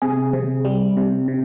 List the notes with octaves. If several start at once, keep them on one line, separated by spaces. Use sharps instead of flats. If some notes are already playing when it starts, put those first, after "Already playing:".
C3 G#4
C3
G3
C3
C3